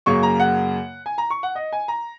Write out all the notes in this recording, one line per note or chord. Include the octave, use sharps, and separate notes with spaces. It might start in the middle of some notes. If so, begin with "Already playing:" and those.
F#2 C#3 F#3 A#3 C#6
A#5
F#5
G#5
A#5
C#6
F#5
D#5
G#5
A#5